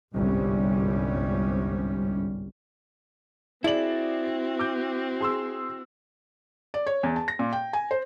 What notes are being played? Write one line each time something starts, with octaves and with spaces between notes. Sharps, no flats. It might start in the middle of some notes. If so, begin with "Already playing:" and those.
G1 C2 G#2 G3 C#4
C4 E4 F#4 G#4 D5 F#7
D6 G6
G#4 C6 E6
D5
C#5
E2
A5
A#6
A#2
G5
G#5
C5